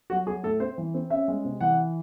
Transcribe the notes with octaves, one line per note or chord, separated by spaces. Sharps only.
F#3 F#4
F#3 G#4
A2 A4
C4 C5
E3
C4
C#4 E5
G#3
C3
E3 F#5